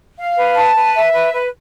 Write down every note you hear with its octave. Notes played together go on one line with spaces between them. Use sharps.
F5
B4
A5
B4
E5
B4
B4